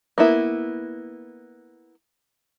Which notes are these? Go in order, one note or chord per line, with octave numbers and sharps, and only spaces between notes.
A#3 B3 E4